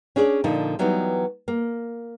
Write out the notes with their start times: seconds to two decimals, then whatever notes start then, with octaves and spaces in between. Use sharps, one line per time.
0.16 C#4 D4 G#4 C5 D5
0.44 A#2 D3 F3 D#4
0.79 E3 F#3 G3 B3 D#4 G4
1.48 A#3